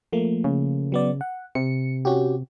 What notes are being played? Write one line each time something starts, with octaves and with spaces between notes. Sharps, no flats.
F3 A3 A#3
C#3
F#3 B3 D5
F#5
C3 C#7
C#4 F#4 G4